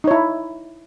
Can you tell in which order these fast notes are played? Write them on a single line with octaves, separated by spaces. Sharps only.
D#4 C#5 E4